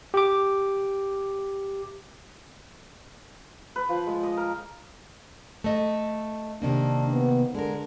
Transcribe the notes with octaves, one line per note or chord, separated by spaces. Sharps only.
G4 D6
B4
F3
G#3
D#5
A#4
A3 D#5
C3 D#3 A#3 D4
B3
D3 G#3 A#4